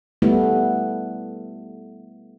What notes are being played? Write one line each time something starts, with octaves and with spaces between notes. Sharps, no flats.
G3 A3 B3 E4